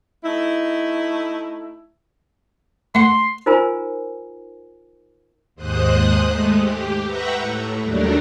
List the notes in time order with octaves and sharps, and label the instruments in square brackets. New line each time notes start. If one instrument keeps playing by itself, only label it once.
[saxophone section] A3 D#4 E4
[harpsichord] A3 F#5 [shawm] C6
[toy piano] D#4 F4 A#4 C5 G#5 A#5
[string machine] D#2 G#2 C5 D#6 F#6
G#3 A3
G4
B4 E5 F#5 G5 A#5 C#6
A2
D#2 F#3 G3 A3 D4 A#4